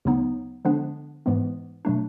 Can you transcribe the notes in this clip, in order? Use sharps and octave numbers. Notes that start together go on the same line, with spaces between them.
D2 C#3 F#3 B3 D#4
D3 F3 G#3 B3 D4
G#2 E3 G#3 B3
B2 F#3 A3 D4